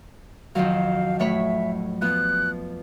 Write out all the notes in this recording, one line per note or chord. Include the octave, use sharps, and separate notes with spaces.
F2 D#3 F#3 F5
A2 C#5 E5 B5
F3 B3 F#6